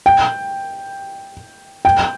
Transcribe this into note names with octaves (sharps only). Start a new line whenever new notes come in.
G5
G5